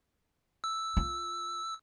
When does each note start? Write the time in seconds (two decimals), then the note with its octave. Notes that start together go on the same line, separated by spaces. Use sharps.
0.64 E6
0.97 F4